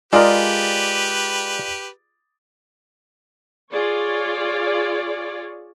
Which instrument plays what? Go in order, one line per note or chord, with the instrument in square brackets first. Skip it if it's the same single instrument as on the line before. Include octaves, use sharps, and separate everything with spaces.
[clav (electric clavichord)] G#3 A#4 [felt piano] F4 G#4 D5 [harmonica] G4 B4
[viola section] F4 G#4 C#5 D5